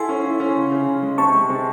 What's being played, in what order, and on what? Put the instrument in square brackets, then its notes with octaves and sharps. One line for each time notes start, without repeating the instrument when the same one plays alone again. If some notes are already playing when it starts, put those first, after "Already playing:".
Already playing: [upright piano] E4 A4 [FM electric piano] F#5 G#5 C6
[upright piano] C#4
E4
C#4
C#3
C#3
C#3
G#3
[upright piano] C3 [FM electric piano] A5 C#6
[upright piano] G#3
C3